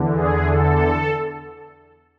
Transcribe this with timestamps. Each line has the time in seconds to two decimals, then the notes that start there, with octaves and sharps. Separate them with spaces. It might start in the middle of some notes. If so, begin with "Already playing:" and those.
Already playing: E2 D3
0.16 G#4
0.50 A4